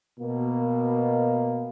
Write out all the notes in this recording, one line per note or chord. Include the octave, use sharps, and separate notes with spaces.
B2 A#3